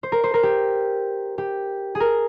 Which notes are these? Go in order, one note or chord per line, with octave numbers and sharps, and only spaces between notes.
C5
A#4
C5
A#4
G4
G4
G#4
A#4